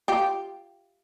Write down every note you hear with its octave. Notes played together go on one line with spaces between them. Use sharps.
F4 G4